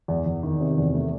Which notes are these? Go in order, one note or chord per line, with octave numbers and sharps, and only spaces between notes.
E2
E2
D#3
C3
E2
A3